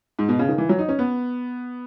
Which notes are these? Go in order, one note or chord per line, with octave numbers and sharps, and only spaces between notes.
G#2
B2
C#3
D#3
E3
F#3
D#4
C#4
B3